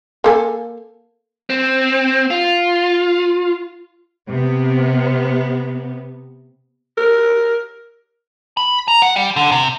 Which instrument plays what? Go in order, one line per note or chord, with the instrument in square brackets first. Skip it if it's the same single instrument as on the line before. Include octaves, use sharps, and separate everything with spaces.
[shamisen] A#3 A4 G#5
[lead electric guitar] C4
F4
[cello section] C3 B3
[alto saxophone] A#4
[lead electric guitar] B5
A#5
F#5
G3
D3
C3